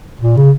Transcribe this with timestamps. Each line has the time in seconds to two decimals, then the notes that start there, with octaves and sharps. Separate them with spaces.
0.21 A#2
0.37 C#3